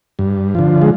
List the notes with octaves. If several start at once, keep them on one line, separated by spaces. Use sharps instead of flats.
G2
D3 F3
G#3